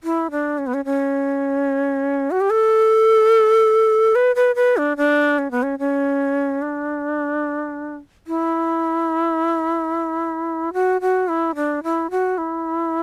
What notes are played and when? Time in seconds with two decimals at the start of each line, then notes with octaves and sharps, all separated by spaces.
0.04 E4
0.31 D4
0.58 C#4
0.67 B3
0.74 C#4
0.85 C#4
2.31 F#4
2.41 G4
2.50 A4
4.15 B4
4.36 B4
4.55 B4
4.77 D4
4.97 D4
5.38 C#4
5.51 B3
5.63 C#4
5.79 C#4
6.62 D4
8.27 E4
10.73 F#4
11.01 F#4
11.28 E4
11.55 D4
11.83 E4
12.11 F#4
12.38 E4